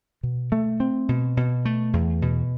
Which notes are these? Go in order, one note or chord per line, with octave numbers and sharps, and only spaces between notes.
B2
A3
C4
B2
B2
A3
E2
B2